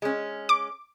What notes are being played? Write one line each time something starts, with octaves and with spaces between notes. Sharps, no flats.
G#3 C#4
D6